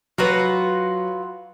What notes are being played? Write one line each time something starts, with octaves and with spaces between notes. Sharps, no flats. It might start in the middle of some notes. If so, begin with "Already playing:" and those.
F#3 F4 F#4 B4